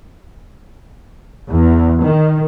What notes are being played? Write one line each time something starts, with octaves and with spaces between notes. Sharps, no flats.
E2
D#3